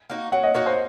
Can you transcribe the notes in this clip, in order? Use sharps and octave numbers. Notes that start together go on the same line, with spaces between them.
A#3 D#4 F#4
F#3 F#5
D#5
A#3 D#4 F#4 C#5
C5